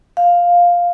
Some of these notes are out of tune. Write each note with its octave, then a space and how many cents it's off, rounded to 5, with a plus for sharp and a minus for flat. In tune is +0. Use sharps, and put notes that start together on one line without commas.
F5 +5